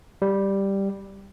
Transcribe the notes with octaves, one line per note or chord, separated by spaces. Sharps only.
G3